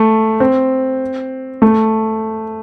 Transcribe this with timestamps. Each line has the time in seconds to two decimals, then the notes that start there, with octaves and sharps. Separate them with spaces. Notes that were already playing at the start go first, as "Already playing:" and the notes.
Already playing: A3
0.40 C4
1.62 A3